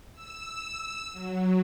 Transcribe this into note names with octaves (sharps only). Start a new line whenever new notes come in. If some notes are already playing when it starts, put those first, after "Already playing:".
E6
F#3